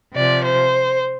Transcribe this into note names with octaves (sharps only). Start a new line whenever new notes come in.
C3 F3 D5
C5